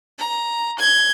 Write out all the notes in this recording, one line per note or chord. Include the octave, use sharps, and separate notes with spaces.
A#5
G6 G#6